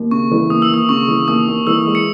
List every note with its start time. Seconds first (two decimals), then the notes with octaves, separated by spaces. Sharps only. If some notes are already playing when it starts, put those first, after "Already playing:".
Already playing: D#2
0.11 C#3 C#6
0.31 E3
0.50 D#2 D#6
0.62 E6
0.70 D#2 D#6
0.89 C#3 C#6
1.08 E3
1.28 D#2 D#6
1.48 D#2
1.67 E3 E6
1.86 G#3
1.95 C#7